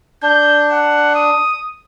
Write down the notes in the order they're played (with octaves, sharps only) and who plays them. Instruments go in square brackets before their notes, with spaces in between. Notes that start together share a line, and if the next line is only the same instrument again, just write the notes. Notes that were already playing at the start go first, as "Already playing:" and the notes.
[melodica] D4 [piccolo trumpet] G6
[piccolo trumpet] F#5
D#6